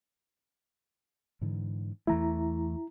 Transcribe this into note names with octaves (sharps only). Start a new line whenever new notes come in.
G#2 D3 E3
E2 E3 A3 E4 A#5